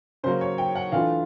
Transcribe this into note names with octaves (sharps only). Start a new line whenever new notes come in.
C#3 F#3 A#3 C5
C#5
G5
F#5
E3 A3 D4 F4 F5